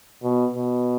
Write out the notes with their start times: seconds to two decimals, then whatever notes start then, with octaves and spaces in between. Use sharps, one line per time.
0.23 B2
0.55 B2